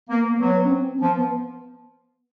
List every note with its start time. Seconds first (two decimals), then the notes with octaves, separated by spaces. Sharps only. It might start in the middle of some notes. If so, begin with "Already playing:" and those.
0.09 A#3 B3
0.24 A#3
0.36 A#3
0.40 F#3 B3
0.64 C#4
0.70 C4
0.97 C4
1.02 F3 B3
1.17 B3